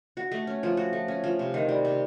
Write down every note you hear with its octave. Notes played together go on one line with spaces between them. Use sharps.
F#4
A3
C#4
F3
F#4
A3
C#4
F3
C3
D#3
G3
C3